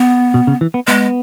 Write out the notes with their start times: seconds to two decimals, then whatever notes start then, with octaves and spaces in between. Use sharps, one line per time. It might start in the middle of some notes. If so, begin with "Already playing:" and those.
Already playing: B3
0.34 B2
0.47 C#3
0.61 E3
0.74 B3
0.87 G#3 B3